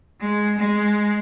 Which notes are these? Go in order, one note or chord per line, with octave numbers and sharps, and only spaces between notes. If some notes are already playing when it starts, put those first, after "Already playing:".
G#3
G#3